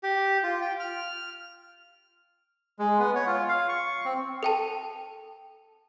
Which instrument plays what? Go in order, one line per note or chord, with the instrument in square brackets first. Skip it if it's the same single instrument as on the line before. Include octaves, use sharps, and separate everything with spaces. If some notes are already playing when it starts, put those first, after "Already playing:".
[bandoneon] G4
F4
G5
F6
[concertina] G#3
B3
C#5
F4
F5
C#6
C4
[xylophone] A4 G5 A5